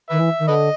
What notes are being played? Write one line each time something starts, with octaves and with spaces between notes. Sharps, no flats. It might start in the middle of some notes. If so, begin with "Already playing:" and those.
D#3 B4 E5
E3
D#3
D3 B4 D#5